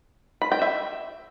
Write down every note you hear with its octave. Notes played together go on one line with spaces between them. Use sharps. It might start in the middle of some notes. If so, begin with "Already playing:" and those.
B5
G5
E5